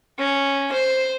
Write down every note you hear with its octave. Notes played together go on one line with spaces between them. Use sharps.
C#4
C5